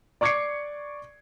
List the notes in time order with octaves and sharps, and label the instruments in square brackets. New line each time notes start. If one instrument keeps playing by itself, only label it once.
[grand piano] D5 C#6 D6 G#6 C7 C#7